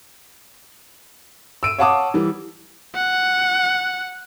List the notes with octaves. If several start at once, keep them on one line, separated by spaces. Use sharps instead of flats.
E6 D7 D#7
C#5 F5 F#5 A5 D6 D#6
E3 G3
F#5